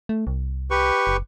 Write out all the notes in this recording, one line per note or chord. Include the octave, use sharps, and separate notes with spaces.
A3
C2
G4 B4 C#6
F#1